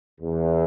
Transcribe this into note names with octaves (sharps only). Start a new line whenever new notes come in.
E2